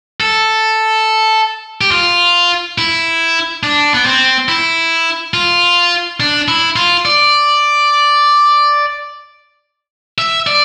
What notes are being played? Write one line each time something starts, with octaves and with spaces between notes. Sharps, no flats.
A4
G4
F4
E4
D4
B3
C4
E4
F4
D4
E4
F4
D5
E5
D5